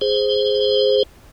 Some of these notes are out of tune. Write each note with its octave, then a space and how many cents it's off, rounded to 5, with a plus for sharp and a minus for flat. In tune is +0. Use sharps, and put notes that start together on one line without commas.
G#4 +0 C5 +0